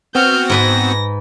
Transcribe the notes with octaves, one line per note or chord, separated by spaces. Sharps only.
B3 C4 F#4 F6 G6
G#2 B4 G#5 A#6